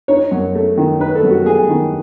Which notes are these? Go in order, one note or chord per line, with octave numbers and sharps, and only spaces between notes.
D#4 C#5
F#2
A3
D#3
D#4 B4
A4
F#2
F#4
A3 G#4
D#3